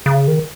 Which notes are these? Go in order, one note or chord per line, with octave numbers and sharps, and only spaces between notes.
C#3
D#3